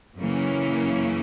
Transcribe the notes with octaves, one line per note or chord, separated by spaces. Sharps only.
F#2 C#3 E3 A#3 C#4